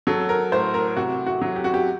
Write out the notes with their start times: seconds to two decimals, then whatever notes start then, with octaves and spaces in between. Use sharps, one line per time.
0.07 F#3 A4
0.29 A#4
0.52 A2 C5
0.74 A#4
0.97 C3 F#4
1.26 F#4
1.42 F#3
1.56 G4
1.64 F#4
1.74 G4